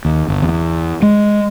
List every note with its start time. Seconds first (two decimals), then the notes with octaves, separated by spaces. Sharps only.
0.05 D#2
0.28 G1
0.42 E2
1.02 G#3